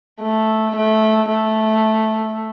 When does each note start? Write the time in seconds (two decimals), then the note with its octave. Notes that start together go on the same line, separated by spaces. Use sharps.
0.22 A3
0.77 A3
1.31 A3